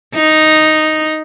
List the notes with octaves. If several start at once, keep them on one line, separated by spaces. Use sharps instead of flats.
D#4